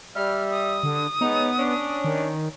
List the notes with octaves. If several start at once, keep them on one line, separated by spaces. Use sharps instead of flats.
G3 E5 F6
D#6
D3
G#3 B3 D#4 C#5
C#4 D4
D#3